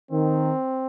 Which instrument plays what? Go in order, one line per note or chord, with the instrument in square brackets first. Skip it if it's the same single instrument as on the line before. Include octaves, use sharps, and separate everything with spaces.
[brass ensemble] D#3 [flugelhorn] C4